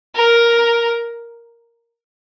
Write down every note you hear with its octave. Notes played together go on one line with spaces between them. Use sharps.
A#4